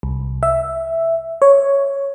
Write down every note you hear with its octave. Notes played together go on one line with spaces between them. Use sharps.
C2
E5
C#5